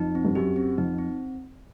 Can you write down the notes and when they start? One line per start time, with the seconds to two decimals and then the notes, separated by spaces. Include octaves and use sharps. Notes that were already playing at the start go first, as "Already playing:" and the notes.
Already playing: F2 D#4
0.15 C4
0.25 G2
0.35 F#2 G4
0.56 C4
0.78 F2 D#4
0.98 C4